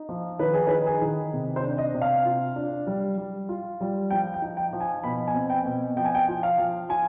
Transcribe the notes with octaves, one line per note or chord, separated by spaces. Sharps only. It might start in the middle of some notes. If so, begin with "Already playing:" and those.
Already playing: D#4
F3
D#3 B4
G#4
B4
D#4
G#4
D#3
C3
C5
D4
D#5
C3
F5
F4
D4
G3
G3
F4
G3
F3 G5
G5
D#4
G5
F3
G#5
B2 B5
G#5
C4
G5
B2
F3 G5
G#5
G5
F4
F5
F3
F4 G#5